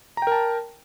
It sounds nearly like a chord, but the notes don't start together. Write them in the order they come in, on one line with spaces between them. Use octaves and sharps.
A#5 G5 A#4 A5